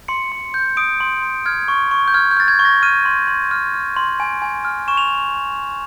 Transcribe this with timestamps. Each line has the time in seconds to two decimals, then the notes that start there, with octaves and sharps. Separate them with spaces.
0.08 C6 C#7
0.32 C6
0.54 G6
0.77 D#6 D7
1.00 C6
1.22 C6
1.46 F6 G#6
1.68 C#6
1.91 C#6
2.08 G6
2.14 F6 G#6
2.31 G6
2.37 F6 A6
2.48 G#6
2.59 C#6
2.65 A#6
2.83 F6 D#7
3.05 C6
3.28 C6
3.51 F6
3.74 F6
3.97 C6
4.20 G#5
4.42 G#5
4.65 F6
4.88 C#6 E7
4.97 F7